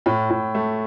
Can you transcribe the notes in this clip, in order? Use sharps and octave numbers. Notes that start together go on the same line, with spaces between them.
A2
A2
A3